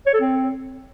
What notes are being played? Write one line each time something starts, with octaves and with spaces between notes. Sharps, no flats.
C#5
A4
C4